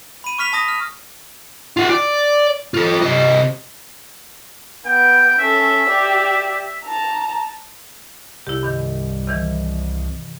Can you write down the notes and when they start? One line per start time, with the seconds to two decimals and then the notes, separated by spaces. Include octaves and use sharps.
0.24 B5 D#7
0.38 C#6 F6 B6 F7
0.53 A5 D#6 A#6
0.68 F6
1.77 F4 F#5
1.89 D5
2.74 F4 A4
3.02 C3 D#5
4.86 B3 G5
5.39 C#4 A4 E5
5.90 G4 D5
6.84 A5 A#5
8.47 C2 E4 G4
8.63 G2 D#3
9.27 C3 D#3 E3